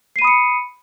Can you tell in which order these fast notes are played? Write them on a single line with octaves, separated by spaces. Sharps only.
C7 D#7 B5 D#6 C#7